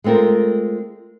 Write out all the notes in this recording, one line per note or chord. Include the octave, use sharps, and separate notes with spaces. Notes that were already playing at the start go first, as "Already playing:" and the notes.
G#3 A3 C4 F4 A#4